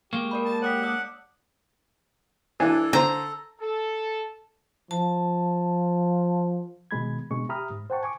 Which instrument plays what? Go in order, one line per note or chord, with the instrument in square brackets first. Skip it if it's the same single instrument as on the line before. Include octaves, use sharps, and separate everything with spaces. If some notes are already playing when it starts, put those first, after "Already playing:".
[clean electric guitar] G#3 A#3 [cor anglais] G4 [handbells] C#6
[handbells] A#4 D5 B5
[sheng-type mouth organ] A5
[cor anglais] G4 [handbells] C#5 D#6 B6 [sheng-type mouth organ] F#5
[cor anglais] D4 [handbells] D5 D#6 E6
[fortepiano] E3 D4 G#5 [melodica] A4
[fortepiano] D3 C5 [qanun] A#5
[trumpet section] A4
[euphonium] F3 [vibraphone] A5
[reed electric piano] B2 D#3 G#3 B5 G#6
B2 G#3 D4 C#6
G4 E5 A#5 B5 D#6 F6
G#2
C5 F#5 G5 A5 C#6
G#5 C#6 D6